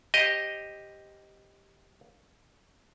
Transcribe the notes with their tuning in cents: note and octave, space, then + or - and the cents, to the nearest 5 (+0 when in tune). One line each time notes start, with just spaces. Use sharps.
G4 +5 C5 +15 D#5 +0